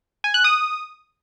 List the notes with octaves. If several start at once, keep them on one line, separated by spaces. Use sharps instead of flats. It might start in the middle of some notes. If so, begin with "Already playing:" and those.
G#5
F#6
D#6